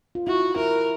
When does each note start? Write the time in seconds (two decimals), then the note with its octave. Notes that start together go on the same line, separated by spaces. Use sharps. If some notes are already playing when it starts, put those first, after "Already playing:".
0.15 F4
0.27 E4 F#4
0.56 E4 A#4